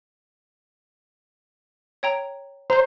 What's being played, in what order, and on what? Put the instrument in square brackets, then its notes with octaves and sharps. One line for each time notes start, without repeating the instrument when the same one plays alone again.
[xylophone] C#5 G5 A#5
[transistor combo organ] C5 [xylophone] A#5 G6